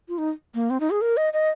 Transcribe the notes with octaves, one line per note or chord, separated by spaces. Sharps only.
F4
D#4
A#3
C4
D#4
G#4
A#4
D#5
D#5